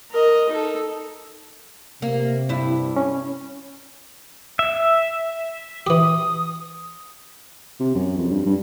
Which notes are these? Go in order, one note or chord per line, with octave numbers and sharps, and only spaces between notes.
A#4 D#5
D#4 A4
C3 A#3
G2 E4
C#4
E5
E3 G4 D#6
C3
F#2
F2
G2
G2